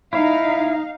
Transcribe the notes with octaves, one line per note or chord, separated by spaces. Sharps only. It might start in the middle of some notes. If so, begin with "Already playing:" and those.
D#4 E4 F5